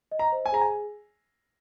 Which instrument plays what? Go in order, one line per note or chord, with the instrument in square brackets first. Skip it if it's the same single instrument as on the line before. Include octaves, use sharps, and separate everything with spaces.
[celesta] D#5
[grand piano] A#5
[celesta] C5
[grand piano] G#5
[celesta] G#4 [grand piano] A#5
[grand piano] G#5